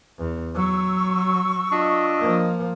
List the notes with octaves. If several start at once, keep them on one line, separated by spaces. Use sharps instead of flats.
E2
F#3 C#6 E6
D4 F4 D#5
F3 A#3